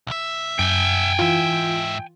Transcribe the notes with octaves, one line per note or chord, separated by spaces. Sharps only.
B1 E5
F#2 G5 G#5
G#2 E3 F4 E5